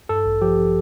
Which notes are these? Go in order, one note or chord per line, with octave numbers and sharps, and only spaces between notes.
G2 A4
A1
F3 G4